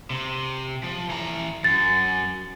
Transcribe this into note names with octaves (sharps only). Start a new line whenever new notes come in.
C3
F3
E3 A#5
F#2 A6